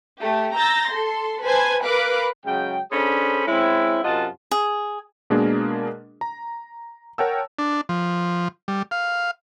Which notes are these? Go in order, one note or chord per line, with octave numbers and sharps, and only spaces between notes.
A3 G4
A#5 E6 G6 A6 A#6
A4 C6
B4 C5 G#5 A5 G#6
A#4 B4 F5 B5 D6 F#6
C#3 F#3 G#3 G5
C#4 D4 G#4 A4 C5 B5
G#3 C4 C#4 E4
F#2 C3 F4 D#5 F#5 A5
G#4
B2 G#3 A#3 D4 G#4 A#4
A#5
A#4 C#5 F#5 G5 A5 E6
D4
F3
G3
F5